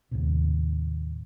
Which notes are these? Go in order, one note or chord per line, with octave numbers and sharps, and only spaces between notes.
D#2 A2 C3